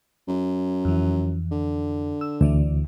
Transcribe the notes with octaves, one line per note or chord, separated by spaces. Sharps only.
F#2
F2 E3
D3
E6
D2 E3 D5 E5